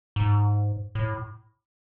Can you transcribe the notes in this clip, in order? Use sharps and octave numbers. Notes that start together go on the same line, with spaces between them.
G#2
A2